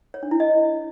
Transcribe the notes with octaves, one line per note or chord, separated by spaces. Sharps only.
C#5
D4
E4
D#5